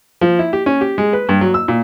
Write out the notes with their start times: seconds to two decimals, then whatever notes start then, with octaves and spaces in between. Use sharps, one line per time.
0.21 F3
0.39 E4
0.53 G4
0.66 C#4
0.81 G4
0.98 G#3
1.13 B4
1.29 G2
1.41 F#3
1.54 E6
1.68 A#2